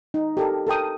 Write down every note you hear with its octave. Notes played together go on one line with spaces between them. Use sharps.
D#4
G4 A4 A#4
A4 A#4 G5 D#6